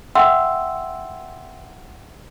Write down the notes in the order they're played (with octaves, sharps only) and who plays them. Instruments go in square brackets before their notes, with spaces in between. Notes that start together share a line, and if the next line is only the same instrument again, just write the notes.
[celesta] E5 F#5 G5 C6 E6